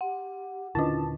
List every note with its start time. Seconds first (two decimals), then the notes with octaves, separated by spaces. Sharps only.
0.01 G4 F#5
0.75 D#1 D3 C#4 D4 E4 F4 D#5 A5